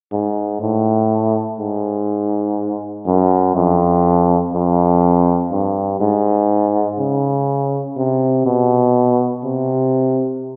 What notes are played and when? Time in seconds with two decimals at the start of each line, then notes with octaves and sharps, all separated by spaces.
0.12 G#2
0.61 A2
1.59 G#2
3.06 F#2
3.55 F2
4.54 F2
5.52 G2
6.00 G#2
6.99 C#3
7.97 C3
8.46 B2
9.44 C3